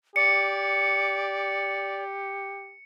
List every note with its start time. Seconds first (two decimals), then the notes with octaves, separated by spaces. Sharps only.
0.16 G4 D5 C#7